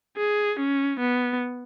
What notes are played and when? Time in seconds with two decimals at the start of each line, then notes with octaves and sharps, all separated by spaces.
0.17 G#4
0.59 C#4
1.00 B3